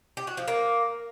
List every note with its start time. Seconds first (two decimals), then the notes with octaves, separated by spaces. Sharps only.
0.17 G4
0.27 F#4
0.37 F3
0.48 A#3